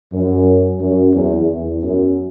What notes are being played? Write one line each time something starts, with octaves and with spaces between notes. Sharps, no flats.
F#2
F#2
E2
E2
F#2